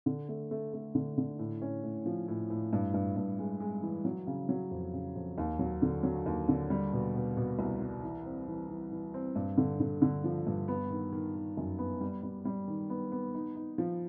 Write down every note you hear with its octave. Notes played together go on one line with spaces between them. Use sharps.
D3
A3
A3
A3
D3
D3
A2
C#4
A2
F3
A2
A2
G2
G2
G2
G#3
G#3
E3
F#3
C#3
F#3
F2
C#3
F2
D#2
F#3
D3
F#3
D#2
D3
G3
B2
B2
B2
C2
G3
E3
C4
E3
E3
E3
C4
G2
D3
D3
D3
F3
G2
B3
D#3
D#3
D#3
F#2
B3
G3
G3
G3
D#3
B3
B3
D#4
D#4
F3